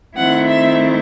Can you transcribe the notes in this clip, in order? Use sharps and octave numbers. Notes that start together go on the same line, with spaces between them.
D#3 A3 C4 E4 F#5
E5